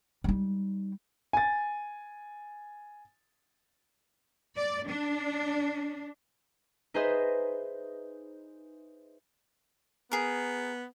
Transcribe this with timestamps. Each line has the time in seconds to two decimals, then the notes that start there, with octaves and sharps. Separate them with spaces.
0.24 G3 D#4
1.33 G#5 A6
4.57 D5
4.89 D4
6.94 D#4 G#4 B4 C5 D#5 E5
10.12 B3 G#4 A#4